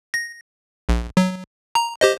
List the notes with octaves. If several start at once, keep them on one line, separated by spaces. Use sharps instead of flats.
A#6
A#1
F#3
A#5
G4 C5 D#5